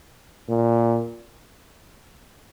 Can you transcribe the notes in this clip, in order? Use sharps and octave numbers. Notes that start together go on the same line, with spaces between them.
A#2